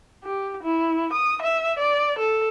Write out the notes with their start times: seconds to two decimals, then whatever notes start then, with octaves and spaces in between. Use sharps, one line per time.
0.24 G4
0.63 E4
1.13 D#6
1.42 E5
1.79 D5
2.19 A4